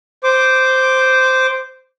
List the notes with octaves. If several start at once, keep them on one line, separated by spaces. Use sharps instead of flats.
C5 D6